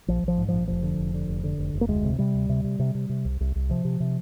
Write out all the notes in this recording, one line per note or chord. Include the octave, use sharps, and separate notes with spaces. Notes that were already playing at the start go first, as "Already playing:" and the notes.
A#1 F3
A#1 F3
G#2
A#1 F3
F1 F3
D3
F1
D3
F1
D3
F1
F1
A#3
D2 G#3
C3
C3 G3
D2
C3
C3
C3
C3
C3
C2
C2
C2
C3 F3
C3
C3